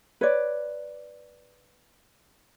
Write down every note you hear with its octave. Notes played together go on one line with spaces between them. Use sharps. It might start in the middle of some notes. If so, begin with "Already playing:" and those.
B4 C#5 D5